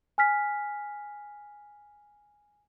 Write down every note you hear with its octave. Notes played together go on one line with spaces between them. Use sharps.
G#5 F6 B6